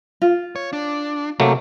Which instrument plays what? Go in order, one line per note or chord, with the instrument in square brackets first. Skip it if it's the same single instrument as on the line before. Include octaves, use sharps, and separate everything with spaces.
[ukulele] F4
[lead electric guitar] C#5
D4
[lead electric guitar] C3 [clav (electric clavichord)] F#3 A3 A#3